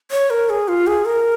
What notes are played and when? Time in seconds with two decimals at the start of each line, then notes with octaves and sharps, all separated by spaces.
0.11 C#5
0.30 A#4
0.50 G#4
0.68 F4
0.87 G#4
1.05 A#4